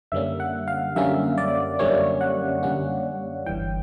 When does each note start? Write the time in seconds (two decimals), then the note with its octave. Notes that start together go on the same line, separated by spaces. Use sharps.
0.12 F#2 D3 G3 A#3 C#4 E5
0.40 F#5
0.68 F5
0.96 F#2 D3 G3 A#3 C#4 E5
1.38 D5
1.79 F#2 D3 G3 A#3 C#4 C#5
2.21 F#5
2.63 F#2 D3 G3 A#3 C#4 F#5
3.46 G1 G2 E3 G5